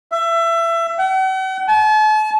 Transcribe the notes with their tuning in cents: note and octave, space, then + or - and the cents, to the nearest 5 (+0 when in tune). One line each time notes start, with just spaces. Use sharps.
E5 +25
F#5 +45
A5 -40